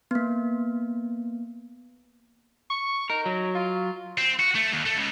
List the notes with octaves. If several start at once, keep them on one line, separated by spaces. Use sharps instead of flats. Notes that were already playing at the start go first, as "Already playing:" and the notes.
A#3 B3
C#6
D#4 A#4
F#3
F4
C4
F#4
A3
D#2
A3
C#2